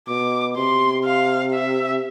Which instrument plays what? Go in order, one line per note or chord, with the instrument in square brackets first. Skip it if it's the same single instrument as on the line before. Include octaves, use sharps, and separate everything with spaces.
[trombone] B2 [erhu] D6
[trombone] C3 [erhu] C6
[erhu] F5
E5